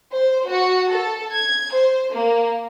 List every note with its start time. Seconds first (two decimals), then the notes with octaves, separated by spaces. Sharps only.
0.12 C5
0.46 F#4
0.91 A4
1.33 G#6
1.73 C5
2.12 A#3